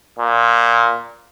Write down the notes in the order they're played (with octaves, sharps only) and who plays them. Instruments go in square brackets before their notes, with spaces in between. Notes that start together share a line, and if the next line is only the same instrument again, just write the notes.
[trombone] A#2